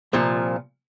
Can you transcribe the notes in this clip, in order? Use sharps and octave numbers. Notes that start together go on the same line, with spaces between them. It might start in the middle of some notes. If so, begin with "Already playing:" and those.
C2 A#2 F3